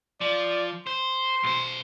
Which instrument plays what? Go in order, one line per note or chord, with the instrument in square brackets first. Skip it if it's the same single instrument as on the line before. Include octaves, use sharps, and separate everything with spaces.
[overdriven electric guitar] F3 [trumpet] D5
[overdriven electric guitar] C5 [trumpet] C6
[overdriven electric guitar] B1 C5